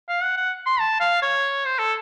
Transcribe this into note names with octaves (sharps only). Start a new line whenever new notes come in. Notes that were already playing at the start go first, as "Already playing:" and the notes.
F5
F#5
F#5
C6
A5
F5
C#5
C5
A4